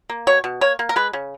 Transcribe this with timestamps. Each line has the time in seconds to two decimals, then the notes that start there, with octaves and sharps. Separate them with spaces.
0.09 A#3
0.27 B2 C#5
0.44 B2
0.61 A#3 C#5
0.79 A#3
0.89 A#4
0.96 G#3 B4
1.13 C#3